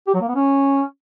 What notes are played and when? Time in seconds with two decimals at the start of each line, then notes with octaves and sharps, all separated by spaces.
0.07 G4
0.14 F#3
0.21 A#3
0.28 B3
0.35 C#4